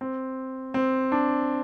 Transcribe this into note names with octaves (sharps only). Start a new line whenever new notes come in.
C4
C4
D4